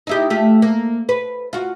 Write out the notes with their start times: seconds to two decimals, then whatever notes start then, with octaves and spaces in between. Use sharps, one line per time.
0.07 D#4 E4 G4
0.30 A3 F4 G4
0.62 A#3
1.09 B4
1.53 F4 F#4